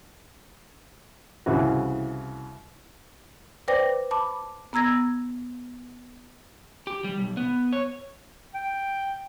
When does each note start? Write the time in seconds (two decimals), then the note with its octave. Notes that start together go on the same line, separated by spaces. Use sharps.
1.46 C2 C#3 E3 F#4
3.68 B4 C5 D5 G5 D6 A#6
4.11 A5 B5 D6
4.73 B3 A#5 E6 G#6 A#6
6.87 G4
7.04 G3
7.18 B1
7.37 B3
7.73 C#5
8.54 G5